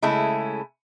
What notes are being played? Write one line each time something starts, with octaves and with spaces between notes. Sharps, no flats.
C#3 G#3 A3 C#4 E4